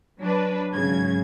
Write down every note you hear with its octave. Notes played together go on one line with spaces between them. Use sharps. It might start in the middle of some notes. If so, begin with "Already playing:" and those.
F#3 D4 B4
G#1 C#3 F#3 G#6